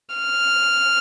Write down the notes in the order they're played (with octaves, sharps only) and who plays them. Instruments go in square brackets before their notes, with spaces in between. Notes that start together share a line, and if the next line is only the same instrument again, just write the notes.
[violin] F6